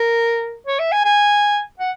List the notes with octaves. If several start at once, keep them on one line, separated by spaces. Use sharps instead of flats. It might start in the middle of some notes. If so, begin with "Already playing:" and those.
Already playing: A#4
C#5
E5
G#5
G#5
F#5